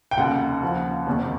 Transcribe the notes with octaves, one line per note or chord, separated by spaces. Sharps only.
G5
F1 D#2 C#3 F#5
D#2 C#3 F3
F#1 E2 C3 D#3